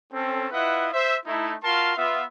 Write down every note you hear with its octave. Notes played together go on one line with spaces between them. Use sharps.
C4 C#4 A4
E4 F4 B4 D#5 E5 F#5
C5 E5
A3 D#4 E4
F4 F#4 A#4 F5 A5 C6
B3 F4 E5